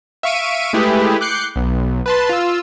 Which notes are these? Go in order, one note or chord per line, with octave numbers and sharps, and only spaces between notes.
E5 F5 C#6 D7 D#7
G#3 A3 E4 G4 G#4 B4
D6 F#6 G6 C7 C#7
B1
B4 A5 C6
F4 E6